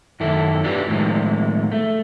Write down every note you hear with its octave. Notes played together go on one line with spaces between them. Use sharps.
F#2 D#3 E4 A4
D4 E4 F#4 G4 B4
A2 D#3 F3 G3 G#3
A3